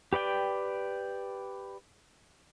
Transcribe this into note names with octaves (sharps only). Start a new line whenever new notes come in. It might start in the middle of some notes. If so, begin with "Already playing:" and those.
G4 B4 D5 G5